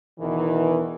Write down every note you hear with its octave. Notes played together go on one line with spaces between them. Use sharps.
E2 B2 D#3 E3